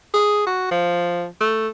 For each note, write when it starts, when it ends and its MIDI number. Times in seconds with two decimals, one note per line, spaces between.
0.14 0.44 68
0.47 0.67 66
0.71 1.25 53
1.40 1.68 57